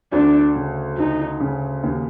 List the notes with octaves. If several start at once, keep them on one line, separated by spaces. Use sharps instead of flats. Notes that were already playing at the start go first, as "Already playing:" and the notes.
D2 D4
C#3
D2 D#4
C#3
D#2